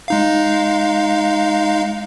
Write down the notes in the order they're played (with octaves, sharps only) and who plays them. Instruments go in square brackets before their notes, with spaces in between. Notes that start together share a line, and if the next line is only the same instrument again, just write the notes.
[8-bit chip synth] G#3 D#4 F5